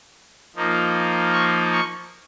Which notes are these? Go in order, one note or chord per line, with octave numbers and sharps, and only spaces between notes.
F3 A#3 D#4
C#6
C#6